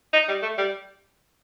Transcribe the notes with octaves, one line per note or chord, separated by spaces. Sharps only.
D#4
G3
A3
G3